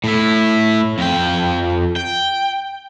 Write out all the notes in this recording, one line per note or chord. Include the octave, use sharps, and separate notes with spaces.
A2 E4
F2 G5
G5